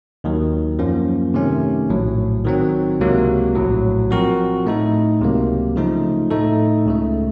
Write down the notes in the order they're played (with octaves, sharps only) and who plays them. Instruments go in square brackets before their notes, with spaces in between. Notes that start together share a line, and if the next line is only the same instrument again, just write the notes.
[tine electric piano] D#2 D#3 F#3
F#2 F3 A#3 C#4
C3 D#3 A3 C#4
A#1 A2 F#3
D#3 F#3 C4
C#2 C3 F#3 A#3
A#1 A2 F#3
F3 C4 F#4 A#4
A2 A3 D#4 A4
C#2 C3 F#3 A#3
C#3 F3 A3 D#4
A2 A3 D#4 A4
C#2 C#3 A3